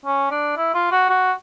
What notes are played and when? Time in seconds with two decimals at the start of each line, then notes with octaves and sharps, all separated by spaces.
0.06 C#4
0.31 D4
0.57 E4
0.74 F4
0.92 F#4
1.09 F#4